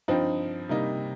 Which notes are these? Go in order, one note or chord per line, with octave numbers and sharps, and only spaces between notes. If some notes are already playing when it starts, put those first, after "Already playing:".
G2 F3 C4 D#4
C3 G3 A#3 D#4